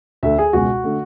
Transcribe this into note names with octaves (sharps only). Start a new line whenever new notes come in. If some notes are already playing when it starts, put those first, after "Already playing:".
D2 D3 A3 E5
G#4
C#2 B2 G#3 F#4
D3 A3